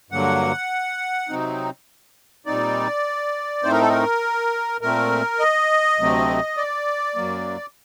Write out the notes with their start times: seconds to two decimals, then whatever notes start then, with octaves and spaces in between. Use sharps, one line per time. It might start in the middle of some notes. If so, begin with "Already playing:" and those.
0.11 G2 D3 F#3 A#3 F#5
1.29 C3 F#3 C4 D#4
2.46 A#2 G3 C4 D#4 D5
3.63 A2 A3 C4 D#4 C5
3.72 A#4
3.81 A4
3.89 A#4
4.81 A#2 A3 C4 A#4
5.39 D#5
5.98 D2 C3 F#3 A3 C4
6.57 D5
7.16 F#2 F#3 A#3